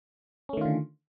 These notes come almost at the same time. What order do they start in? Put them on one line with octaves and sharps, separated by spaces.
C#4 A3 D#3 F4 D3